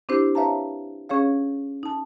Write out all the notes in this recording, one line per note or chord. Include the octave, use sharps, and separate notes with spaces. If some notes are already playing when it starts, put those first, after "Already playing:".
C4 D4 E4 G4 C5
B4 C#5 E5 F5 A5 A#5
C#4 G#4 C#5 F5
D#4 A5